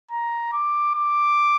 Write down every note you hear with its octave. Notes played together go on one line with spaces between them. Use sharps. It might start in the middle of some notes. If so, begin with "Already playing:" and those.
A#5
D6
D6